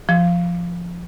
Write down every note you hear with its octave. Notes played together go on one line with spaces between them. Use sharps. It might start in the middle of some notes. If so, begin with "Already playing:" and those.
F3